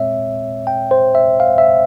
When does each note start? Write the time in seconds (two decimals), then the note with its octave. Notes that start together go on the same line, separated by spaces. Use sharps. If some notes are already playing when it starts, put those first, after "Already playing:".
Already playing: A#2 G#3 C4 C#5 E5
0.67 G5
0.91 C5
1.15 E5
1.40 F5
1.58 E5